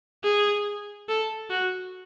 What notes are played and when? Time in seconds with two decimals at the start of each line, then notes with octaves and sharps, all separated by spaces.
0.24 G#4
1.09 A4
1.50 F#4